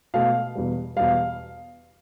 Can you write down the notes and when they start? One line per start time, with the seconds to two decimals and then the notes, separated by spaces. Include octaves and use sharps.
0.14 B2 A3 F5
0.55 E2 B2 G3
0.96 E2 B2 G3 F5